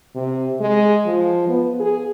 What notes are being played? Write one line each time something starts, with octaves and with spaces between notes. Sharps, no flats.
C3
G#3
F3
B3
G#4